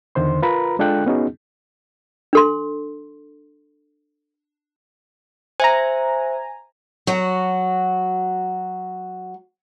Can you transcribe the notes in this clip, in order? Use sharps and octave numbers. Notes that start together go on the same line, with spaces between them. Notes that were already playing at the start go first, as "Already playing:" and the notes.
E2 D3 D#3 C5 C6
F4 A#4 B4 A#5 B5
G#3 D4 F4 A4 G5 F#6
B3 C#4 D#4 F#4 G#4
D4 A4 C6
C5 E5 G#5 A#5
F#3 F#4